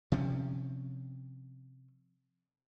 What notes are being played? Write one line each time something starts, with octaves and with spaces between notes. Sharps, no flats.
C3 F3 C4 C#4